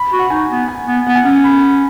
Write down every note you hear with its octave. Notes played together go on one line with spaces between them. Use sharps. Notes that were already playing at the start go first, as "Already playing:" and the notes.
Already playing: B5
F#4
F#5
D#4 G#5
B3
G#5
B3
B3 F#5
G#5
C#4 F#5
B5